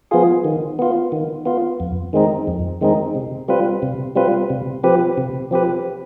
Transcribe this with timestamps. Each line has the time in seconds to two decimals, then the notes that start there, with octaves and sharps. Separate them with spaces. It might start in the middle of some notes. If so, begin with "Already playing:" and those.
0.11 F3 B3 F4 G#4
0.45 D#3
0.79 B3 F4
1.12 D#3
1.46 B3 F4
1.80 F2
2.13 D#3 G#3 C4 D#4
2.47 F2
2.81 D#3 G#3 C4 D#4
3.15 C3
3.48 G3 C4 F4 B4
3.82 C3
4.16 G3 C4 F4 B4
4.50 C3
4.84 F3 C4 G4 B4
5.17 C3
5.51 F3 C4 G4 B4